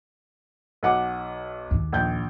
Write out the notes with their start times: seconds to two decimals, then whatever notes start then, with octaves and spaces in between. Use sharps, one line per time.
0.83 B1 F#5 D6
1.71 D#2 D#3
1.93 A#1 G6